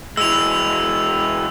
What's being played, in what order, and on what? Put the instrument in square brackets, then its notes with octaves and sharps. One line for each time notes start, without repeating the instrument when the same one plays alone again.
[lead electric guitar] E3 G#3 [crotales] E6 F7